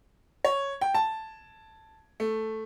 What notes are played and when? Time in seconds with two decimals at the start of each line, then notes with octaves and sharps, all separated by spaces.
0.45 C#5
0.81 G5
0.94 A5
2.20 A3